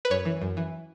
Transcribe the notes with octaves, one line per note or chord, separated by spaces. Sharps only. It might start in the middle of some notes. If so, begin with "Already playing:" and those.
B4
F#2 C#5
E3
F#2
E3